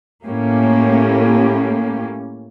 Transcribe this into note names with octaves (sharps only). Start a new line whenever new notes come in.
A2 A#3 C#4 G4